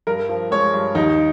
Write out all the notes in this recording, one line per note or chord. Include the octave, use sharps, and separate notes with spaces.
G2 A#4
F3
G#3 C#5
G2
D#2 D#4